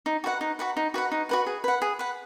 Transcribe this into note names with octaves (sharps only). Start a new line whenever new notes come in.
D#4
F#4 B4 F#5
D#4
F#4 B4 F#5
D#4
F#4 B4 F#5
D#4
F#4 B4 F#5
G#4
B4 F#5
G#4
B4 F#5